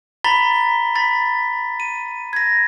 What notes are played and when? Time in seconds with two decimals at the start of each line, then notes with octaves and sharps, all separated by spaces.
0.24 A#5 B5 A6 B6 G7
0.95 B5 A6 B6
1.80 D#7
2.33 G#6 A#6